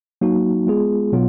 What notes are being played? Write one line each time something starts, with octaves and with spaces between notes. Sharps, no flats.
F#3 A#3 D#4 F#4
G#3 B3 F4 G#4
B2 F#3 B3 F4